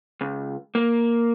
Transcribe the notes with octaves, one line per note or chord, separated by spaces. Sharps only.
C#2
A#3